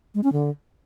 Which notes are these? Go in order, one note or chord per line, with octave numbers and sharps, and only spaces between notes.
G#3
C#4
D3